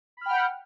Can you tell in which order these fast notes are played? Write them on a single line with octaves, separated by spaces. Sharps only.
B5 F6 G5 F#5